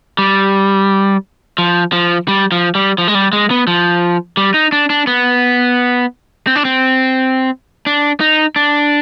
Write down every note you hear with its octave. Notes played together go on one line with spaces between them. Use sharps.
G3
F3
F3
G3
F3
G3
F3
G#3
G3
G#3
B3
F3
G3
D#4
D4
D4
B3
C4
D4
C4
D4
D#4
D4